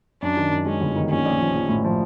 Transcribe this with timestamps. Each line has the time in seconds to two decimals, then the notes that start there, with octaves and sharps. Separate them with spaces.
0.22 F#2 D4
0.37 D#3
0.51 F#2
0.66 G#3 C#4
0.81 G1
0.96 D#3
1.10 A#1 C#4
1.26 A#1
1.40 F3
1.55 A#1
1.69 A2
1.84 F3